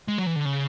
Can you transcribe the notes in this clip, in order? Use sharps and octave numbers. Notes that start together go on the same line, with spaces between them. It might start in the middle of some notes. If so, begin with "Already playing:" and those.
G#3
F#3
E3
D3
C#3